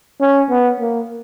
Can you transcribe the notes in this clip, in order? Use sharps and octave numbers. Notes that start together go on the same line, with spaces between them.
C#4
B3
A#3